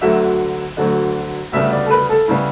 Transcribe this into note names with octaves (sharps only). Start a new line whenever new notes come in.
D2 D3 F#3 E5
D2 D3 F#3
D2 C#3 G3 B3 E5
D5
A4
B4
A4
C#3 G3 B3 E4